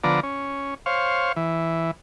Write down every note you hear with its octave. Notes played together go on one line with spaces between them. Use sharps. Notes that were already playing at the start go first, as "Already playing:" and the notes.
D3 F3 B3 D5 A#5
C#4
C5 C#5 F5
E3